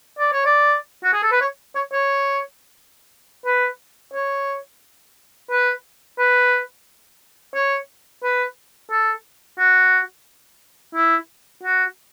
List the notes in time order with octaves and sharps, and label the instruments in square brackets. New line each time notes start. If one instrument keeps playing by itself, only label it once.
[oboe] D5
C#5
D5
F#4
G#4
A4
B4
C#5
C#5
C#5
B4
C#5
B4
B4
C#5
B4
A4
F#4
E4
F#4